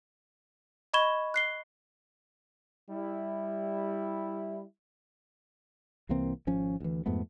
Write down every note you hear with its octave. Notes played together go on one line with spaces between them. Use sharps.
D#5 B5 C#6 G#6 E7 G7
F#6 C7 G7
G3 E4
C2 E3 A#3 C4
G#1 F3 C#4
D2 E3
F2 G#2 A3 B3